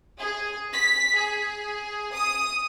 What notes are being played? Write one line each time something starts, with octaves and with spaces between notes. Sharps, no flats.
G#4
B6
G#4
D#6